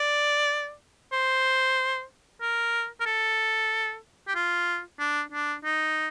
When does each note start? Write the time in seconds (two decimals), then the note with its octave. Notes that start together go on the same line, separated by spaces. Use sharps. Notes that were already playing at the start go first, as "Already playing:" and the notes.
Already playing: D5
1.12 C5
2.41 A#4
3.00 A#4
3.06 A4
4.28 G4
4.35 F4
4.99 D4
5.32 D4
5.64 D#4